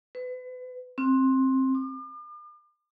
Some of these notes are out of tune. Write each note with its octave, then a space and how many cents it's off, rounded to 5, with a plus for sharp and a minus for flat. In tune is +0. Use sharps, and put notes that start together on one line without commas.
B4 +35
C4 +15
D6 +45